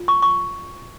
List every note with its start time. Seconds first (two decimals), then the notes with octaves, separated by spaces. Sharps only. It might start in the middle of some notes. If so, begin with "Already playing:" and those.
Already playing: F4
0.08 C#6
0.22 C#6